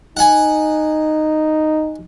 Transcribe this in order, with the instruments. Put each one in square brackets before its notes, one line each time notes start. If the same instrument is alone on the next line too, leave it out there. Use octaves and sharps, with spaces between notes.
[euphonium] D#4 [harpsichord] F#5 G#5